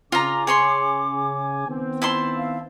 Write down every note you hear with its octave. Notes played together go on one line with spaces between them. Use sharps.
C#3 F4 G#5 A#5 D6
G#4 C#5 C6
D#3 B3 C4
E4 A5 C6
F5